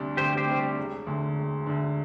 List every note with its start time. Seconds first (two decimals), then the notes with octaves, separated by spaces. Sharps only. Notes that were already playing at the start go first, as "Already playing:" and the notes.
Already playing: D2 C3 G3 D4
0.17 D2 G4 C5
0.37 G4 C5
0.47 C3 G3 D4
0.77 E1
1.07 D2 D3
1.36 E1
1.66 D2 D3